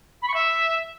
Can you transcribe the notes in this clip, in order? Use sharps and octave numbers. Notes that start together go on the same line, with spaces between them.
B5
C#6
E5